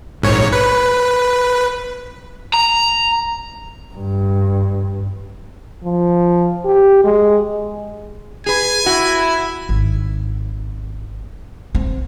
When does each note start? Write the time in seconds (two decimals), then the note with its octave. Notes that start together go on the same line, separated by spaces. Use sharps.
0.22 A#1 G#2 C#5
0.52 B4
2.53 A#5
3.94 G2
5.84 F3
6.65 G4
7.04 G#3
8.46 G#4 B4 G#5
8.86 E4 F#4
9.69 G#1
11.75 C4